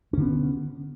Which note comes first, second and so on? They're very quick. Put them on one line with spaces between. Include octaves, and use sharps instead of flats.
C#4 D3 B3